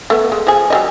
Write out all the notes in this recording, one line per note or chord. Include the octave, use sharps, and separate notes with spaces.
A3 B3
G#3
F3 G#4
F#3 G3 D#5